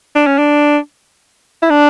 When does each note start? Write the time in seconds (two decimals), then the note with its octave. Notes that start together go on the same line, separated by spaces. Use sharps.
0.15 D4
0.27 C#4
0.38 D4
1.62 E4
1.70 D4